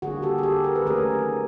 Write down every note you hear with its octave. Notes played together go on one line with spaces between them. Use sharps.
D3 G3 A#3 F#4 G#4
G4 A4
G#4
G4 A4
A#4
B4
D#3 F#3 A3 C#4 G#4 A#4